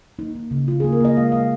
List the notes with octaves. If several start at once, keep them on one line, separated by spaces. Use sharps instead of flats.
A#3 D#4
A#3
C#3
C#3 F4
G#4
A#3
A#4
A#3 D#5
G#3 F5
G#3 F5